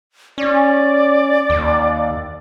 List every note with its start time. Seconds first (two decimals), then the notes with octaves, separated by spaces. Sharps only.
0.38 C#4 D5
1.50 D#2